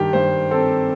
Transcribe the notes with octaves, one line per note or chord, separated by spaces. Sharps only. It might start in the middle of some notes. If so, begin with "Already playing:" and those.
Already playing: G2 D#3 G4
G2 C5
C4 A4